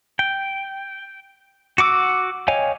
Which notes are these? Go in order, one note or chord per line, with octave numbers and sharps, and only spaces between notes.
G5
F#4 F#5 D6 E6
C#5 D#5 F5 G5 G#5